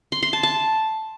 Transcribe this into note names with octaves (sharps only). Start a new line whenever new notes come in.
C6
C6
A5
A5